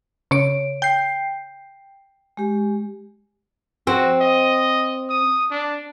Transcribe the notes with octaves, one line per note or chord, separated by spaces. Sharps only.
C#3 C#5 D7
G5 G6 C7
G#3 G4
C4 F#4
D#5
D#6
D4